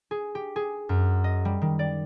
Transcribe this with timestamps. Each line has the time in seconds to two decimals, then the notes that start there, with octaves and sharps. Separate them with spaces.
0.11 G#4
0.35 G4
0.56 G#4
0.89 F#2
1.24 D#5
1.45 G3
1.62 D#3
1.79 D5